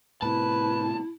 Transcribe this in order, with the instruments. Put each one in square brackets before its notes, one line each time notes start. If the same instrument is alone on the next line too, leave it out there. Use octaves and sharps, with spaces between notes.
[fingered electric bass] A2 C3 [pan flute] E4 [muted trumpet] B4 [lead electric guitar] A5